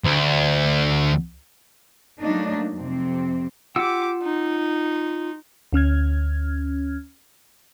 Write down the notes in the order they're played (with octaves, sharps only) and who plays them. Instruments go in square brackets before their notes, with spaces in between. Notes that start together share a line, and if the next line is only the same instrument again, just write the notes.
[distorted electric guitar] D2
[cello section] F#3 A3 A#3 D4 D#4
F2 C3 C4
[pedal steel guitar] F4 F#5 E6 [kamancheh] G4 D6
[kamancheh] D#4
[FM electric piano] D2 C#4 F6 G#6